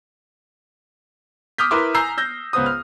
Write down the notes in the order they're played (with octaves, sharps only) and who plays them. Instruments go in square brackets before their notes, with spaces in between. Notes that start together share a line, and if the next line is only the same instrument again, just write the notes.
[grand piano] D6 D#6 F6 G6 B6
E4 A#4 B4 E5 C6 D6
G#5 A#5 E6 G6 C7
E6 G6 A#6
C#2 B3 C5 D#6
F6